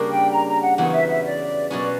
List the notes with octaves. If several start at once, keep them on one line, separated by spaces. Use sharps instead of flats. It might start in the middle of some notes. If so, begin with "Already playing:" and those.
Already playing: C#3 G3 A#3 D4
G5
A#5
A#5
F#5
E2 C#3 F#3 B3 F#5
E5
E5
D5
B2 F#3 C#4 D5